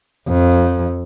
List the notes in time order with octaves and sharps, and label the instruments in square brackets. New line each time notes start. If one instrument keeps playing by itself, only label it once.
[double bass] F2